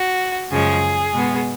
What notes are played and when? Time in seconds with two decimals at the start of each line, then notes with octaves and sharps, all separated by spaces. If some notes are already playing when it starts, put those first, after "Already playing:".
Already playing: F#4
0.52 F#2 C#3 F3 G#3 G#4
1.13 B2 G#3 B3